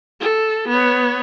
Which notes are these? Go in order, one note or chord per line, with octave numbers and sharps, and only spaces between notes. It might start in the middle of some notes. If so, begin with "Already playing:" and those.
A4
B3 C#5